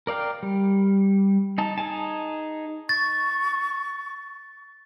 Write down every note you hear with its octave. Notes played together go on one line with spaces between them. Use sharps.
A#4 D5 F5 G5
G3
D#4 A5
D#4 G#4 G#5 A5
C#6 A6